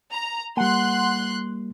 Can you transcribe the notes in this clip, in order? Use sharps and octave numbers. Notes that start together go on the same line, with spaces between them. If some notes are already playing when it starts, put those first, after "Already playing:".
A#5
G3 A#3 F#5 C6 F#6